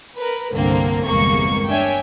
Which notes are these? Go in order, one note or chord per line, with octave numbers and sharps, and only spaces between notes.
A#4 B4
C2 G2 D3 A#3 C4
G1 E2 C3 G#3 A#3 C#6
D4 C#5 E5 G5 G#5